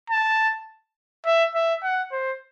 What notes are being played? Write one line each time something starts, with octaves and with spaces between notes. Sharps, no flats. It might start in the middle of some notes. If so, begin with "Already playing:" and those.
A5
E5
E5
F#5
C5